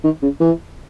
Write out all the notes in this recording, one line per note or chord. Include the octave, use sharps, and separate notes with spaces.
D#3
C#3
E3